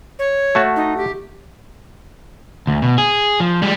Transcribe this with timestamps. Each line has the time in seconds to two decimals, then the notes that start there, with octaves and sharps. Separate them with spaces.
0.19 C#5
0.55 A3 F#4 A5
0.76 D#4
0.97 G4
2.67 D2
2.82 B2
2.98 G#4
3.40 F3
3.62 G3 G#3